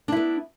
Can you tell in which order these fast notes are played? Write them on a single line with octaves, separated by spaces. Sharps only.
D4 E4 B3